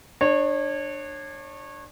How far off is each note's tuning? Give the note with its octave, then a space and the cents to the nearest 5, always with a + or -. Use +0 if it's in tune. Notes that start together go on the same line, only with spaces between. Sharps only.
D4 +20 C#5 -25